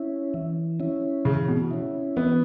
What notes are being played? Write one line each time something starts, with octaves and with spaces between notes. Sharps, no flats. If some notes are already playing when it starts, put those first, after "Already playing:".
Already playing: C#4 E4
E3
C#4 E4
C#3 E3
B2
C#4 E4
E3 B3